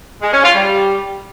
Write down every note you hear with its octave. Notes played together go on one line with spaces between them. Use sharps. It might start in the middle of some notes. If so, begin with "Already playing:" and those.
G#3
C#4
F4
G3